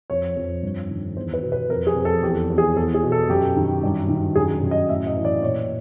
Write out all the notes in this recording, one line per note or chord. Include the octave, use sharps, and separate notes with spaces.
F2 C#5
F2
G2
D#3
E2 C5
B4
B2
B4
F2 A#4
G#4
F2
A4
E2 G4
E2
G#4
E2 A4
G#4
B2
A4
F#2 G4
D#3
G2
D#3
F#2 G#4
F#2
D#5
A2 E5
D#5
E3
D5
A#2 C#5